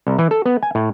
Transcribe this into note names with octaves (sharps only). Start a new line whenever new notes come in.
C2
E3
A4
B3
G#5
A2